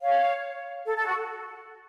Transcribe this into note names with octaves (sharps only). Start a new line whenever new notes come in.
C#5 F5
A4
A4
F#4